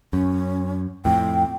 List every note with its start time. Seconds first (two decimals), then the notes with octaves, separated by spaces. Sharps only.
0.13 F#2 C#4
1.05 F2 A2 G5